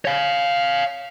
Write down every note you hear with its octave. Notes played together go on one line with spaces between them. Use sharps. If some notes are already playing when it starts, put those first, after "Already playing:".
C#5 F5